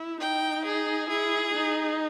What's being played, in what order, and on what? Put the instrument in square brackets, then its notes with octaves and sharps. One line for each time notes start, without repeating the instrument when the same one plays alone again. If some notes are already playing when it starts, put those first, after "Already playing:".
Already playing: [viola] E4
[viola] D#4 [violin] G5
[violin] G#4
[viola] E4 [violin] G#4
[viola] D#4